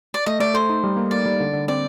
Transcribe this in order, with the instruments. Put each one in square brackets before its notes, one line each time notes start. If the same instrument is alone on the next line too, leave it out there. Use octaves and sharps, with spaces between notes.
[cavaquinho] D5
[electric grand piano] A3 [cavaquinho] D#5
[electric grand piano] A3 [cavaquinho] D5
[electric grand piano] A4 [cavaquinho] C5
[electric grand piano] D#4
G3
A#3
[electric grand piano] A#3 [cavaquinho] D5
[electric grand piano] G3
D3
D3
[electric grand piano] C4 [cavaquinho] D5